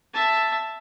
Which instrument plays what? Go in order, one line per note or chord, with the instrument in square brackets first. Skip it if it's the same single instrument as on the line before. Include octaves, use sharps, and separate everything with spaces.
[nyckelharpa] E5 A5